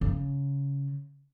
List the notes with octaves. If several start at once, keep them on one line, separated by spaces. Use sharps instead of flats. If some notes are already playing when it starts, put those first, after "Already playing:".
C#3